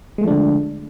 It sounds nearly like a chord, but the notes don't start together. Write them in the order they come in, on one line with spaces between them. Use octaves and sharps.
G#3 A3 F3 D4 D3